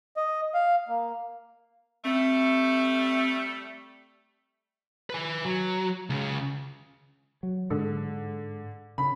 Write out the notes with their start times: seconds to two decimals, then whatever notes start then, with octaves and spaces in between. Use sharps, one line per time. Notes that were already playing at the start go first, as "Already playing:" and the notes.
0.17 D#5
0.54 F5
0.88 A#3
2.04 G3 A3 C4
5.10 B4 G#5
5.45 F#3
6.10 C#2 C#3
7.43 F#3
7.70 G#2 D3
8.98 C#3 B5